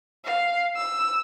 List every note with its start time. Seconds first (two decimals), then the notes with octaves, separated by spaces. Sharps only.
0.25 F5
0.76 E6